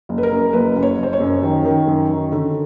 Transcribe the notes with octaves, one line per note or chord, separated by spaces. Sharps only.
F#1
B4
A#4
F#2
F#1 B4
F#1
C#5
F#1
C5
C#5
F#2
D#3
D#3
F#2
D#3
D3